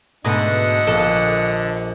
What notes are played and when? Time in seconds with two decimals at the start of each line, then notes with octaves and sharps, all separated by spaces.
0.24 G#2 B2 D3 A3 D#5 F#5 D#6
0.87 A#1 A4